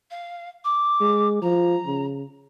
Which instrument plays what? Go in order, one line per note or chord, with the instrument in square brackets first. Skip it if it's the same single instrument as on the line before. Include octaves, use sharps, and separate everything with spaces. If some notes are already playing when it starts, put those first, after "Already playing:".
[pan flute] F5
D6
[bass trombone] G#3
[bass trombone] F3 [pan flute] A#5
[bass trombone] C#3